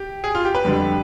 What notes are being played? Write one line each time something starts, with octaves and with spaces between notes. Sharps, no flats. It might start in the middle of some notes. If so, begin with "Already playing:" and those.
Already playing: G4
G#4
F4
G4
B4
F2 D3 G3